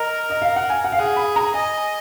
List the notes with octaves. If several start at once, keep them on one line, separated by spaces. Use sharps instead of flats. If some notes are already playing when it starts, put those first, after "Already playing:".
Already playing: A#4 D#5
D#5
F5
F#5
G#5
F#5
F5
G#4 F#5
B5
A#5
D#5 G#5